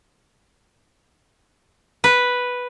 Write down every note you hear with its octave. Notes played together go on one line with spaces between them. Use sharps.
B4